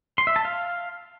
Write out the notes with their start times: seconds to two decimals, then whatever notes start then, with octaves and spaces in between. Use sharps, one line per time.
0.18 C6
0.27 E5
0.36 A5
0.45 F5